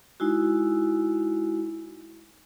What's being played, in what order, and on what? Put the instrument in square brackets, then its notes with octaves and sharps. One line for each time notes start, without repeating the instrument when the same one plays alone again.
[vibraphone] G#3 D#4 E4 F#4